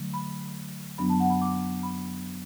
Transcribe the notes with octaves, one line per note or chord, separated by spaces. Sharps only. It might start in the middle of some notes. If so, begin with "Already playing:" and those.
Already playing: D3 F#3 A3
B5
F#2 F#3 B3 D4 B5
A5
F#5
B5
D6
B5